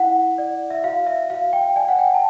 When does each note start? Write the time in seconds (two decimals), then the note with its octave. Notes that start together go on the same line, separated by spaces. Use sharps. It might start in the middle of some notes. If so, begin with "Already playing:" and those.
Already playing: E4 F#5
0.38 D5
0.70 E5
0.84 F#4 F5
1.07 E5
1.30 F#4 F5
1.53 G5
1.76 D5 G#5
1.88 F#5
1.99 G5
2.14 A5